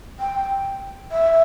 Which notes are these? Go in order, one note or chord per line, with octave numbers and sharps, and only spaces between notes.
G5
E5